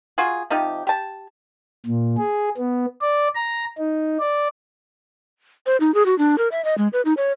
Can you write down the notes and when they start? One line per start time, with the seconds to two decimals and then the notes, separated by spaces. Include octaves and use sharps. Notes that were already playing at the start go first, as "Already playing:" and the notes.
0.18 F4 F#4 G#4
0.50 C3 F3 D#4 G4
0.87 G4 A5
1.86 A#2
2.17 G#4
2.58 B3
3.02 D5
3.35 A#5
3.78 D#4
4.20 D5
5.66 C5
5.80 D#4
5.94 G#4
6.06 F#4
6.18 D4
6.38 A#4
6.52 E5
6.65 D#5
6.78 G#3
6.93 B4
7.05 D#4
7.17 C#5